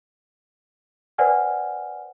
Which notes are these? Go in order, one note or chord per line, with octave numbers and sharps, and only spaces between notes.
B4 C5 D5 F#5 G#5 F6